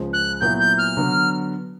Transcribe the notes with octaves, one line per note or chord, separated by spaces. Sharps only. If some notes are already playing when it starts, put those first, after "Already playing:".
Already playing: C#2 C#3 F3 G#3
F#6
A#2 F#3 B3 E4 G6
G6
F6
D3 F#3 B3